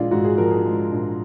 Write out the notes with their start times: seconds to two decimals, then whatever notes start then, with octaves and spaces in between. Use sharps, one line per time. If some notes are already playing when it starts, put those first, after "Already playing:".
Already playing: A#1 G#3 F4 D5
0.11 G#2 F#4
0.24 G#4
0.38 F3 A#4
0.51 G#4
0.65 G#3
0.92 A#1